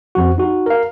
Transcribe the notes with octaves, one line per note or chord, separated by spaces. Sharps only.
F2 F3 F#4
D#4 F#4
A#4 F5